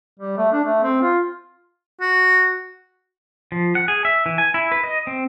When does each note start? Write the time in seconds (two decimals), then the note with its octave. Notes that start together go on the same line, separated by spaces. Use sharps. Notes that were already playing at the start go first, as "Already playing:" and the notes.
0.19 G3
0.37 A3
0.52 D4
0.64 A3
0.83 C4
1.02 F4
2.01 F#4
3.52 F3
3.75 F#5
3.88 G#4
4.05 E5
4.26 E3
4.38 G#5
4.54 E4
4.72 B4
4.84 D#5
5.07 C4